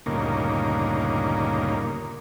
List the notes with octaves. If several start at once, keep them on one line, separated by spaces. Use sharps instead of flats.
D2 G2 A#2 C#3 A#3 D#4